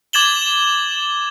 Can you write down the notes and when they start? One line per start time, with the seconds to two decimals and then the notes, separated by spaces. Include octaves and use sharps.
0.13 D6 G#6 A6 E7 F#7 G7